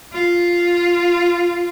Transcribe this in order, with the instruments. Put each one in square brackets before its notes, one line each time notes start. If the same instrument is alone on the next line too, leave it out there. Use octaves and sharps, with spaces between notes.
[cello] F4